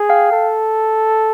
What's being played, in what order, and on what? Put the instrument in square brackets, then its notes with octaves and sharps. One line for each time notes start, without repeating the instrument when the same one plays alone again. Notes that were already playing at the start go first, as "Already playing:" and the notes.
Already playing: [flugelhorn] G#4
[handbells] F5 G5
[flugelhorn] A4